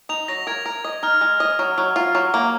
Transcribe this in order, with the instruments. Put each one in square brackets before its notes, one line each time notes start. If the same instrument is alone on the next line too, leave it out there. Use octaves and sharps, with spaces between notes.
[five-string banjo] D#4 [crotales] F7
[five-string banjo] F#3 [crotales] A#6
[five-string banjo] A#4 [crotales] G#6
[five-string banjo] A#4
D#5
[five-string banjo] D#4 [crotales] F6
[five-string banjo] G#3
D#5
F#3
F#3
F4
F#3
A#3